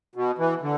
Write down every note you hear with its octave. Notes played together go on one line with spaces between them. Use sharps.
B2
E3
D3